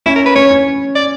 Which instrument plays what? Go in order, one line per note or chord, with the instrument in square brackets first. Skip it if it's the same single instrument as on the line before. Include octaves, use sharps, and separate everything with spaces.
[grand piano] C#4 [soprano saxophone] E4
[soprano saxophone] A#4
B4
[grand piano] C#4 [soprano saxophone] C#5
[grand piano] C#4
[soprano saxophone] D5